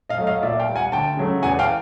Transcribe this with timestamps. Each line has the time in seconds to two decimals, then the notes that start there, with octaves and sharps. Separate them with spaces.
0.09 D#5 F5
0.18 F#3 A3
0.27 D#5 F5
0.43 A#2 D5 E5
0.59 F5 G5
0.68 G3
0.76 F#5 G#5
0.92 D2 G5 A5
1.17 C#3 F#3 A3
1.43 E2 F#5 G#5
1.59 F5 G5